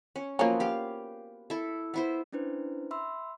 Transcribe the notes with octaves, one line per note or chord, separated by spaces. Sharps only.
C#4
F3 F#3 A#3 B3 C#4
G4 F5
E4 A4
B3 E4 C5
C#4 D4 E4 B4 C5
E5 B5 C6 E6